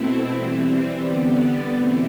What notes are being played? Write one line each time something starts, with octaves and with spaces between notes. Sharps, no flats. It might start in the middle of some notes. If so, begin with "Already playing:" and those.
Already playing: B2 A3 C4 E4
E3 G3 C4
D3 G3 B3 D4
E2 B2 A3 C4 E4